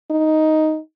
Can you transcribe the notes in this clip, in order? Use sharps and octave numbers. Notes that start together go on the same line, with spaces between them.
D#4